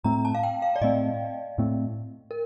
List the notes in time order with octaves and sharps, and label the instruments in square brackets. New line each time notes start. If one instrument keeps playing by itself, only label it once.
[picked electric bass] A2 A3 C4 [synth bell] A#5
[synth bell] A5
F5
G5
F5
D5
[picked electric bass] A2 A3 C4 [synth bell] D#5
[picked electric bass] A2 A3 C4
[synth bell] A#4